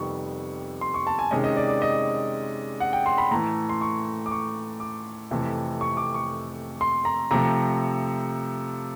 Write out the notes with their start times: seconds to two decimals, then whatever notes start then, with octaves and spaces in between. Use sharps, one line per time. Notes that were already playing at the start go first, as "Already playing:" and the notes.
Already playing: F2 C3 D#3 G3 B3 C#6
0.81 C6
0.94 C#6
1.07 A5
1.19 G#5
1.31 C3 D#3 G#3 C#4 D#5
1.44 D#5
1.56 D5
1.68 D5
1.82 D#5
2.80 F#5
2.93 G5
3.06 C6
3.18 B5
3.31 A2 E3 A3 A#5
3.69 C6
3.81 C#6
4.26 D6
4.31 C#6
4.80 D6
5.31 F2 C3 E3 A3
5.81 C#6
5.97 D6
6.14 C#6
6.81 C6
7.05 A#5
7.31 C3 F3 A3 A#5